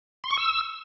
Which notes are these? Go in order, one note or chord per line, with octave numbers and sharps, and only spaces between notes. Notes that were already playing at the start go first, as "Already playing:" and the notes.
C6
C#6
E6